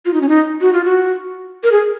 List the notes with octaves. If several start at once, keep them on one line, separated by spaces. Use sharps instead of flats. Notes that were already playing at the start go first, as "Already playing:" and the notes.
F4
D#4
C#4
D#4
F#4
F4
F#4
A#4
G#4